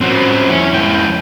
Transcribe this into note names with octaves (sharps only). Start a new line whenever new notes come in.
F3 C4 C#4 F#4
F2 C#4 E4
C#2 G5